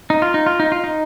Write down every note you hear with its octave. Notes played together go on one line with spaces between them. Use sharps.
D#4
F4
D#4
F4
D#4
F4
D#4